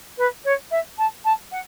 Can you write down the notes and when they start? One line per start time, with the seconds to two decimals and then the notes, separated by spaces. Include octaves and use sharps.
0.18 B4
0.45 C#5
0.71 E5
0.98 A5
1.25 A5
1.52 F#5